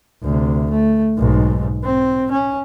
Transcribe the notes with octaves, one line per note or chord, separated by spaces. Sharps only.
D2 C3
A3
B1 G#2
C4
C#4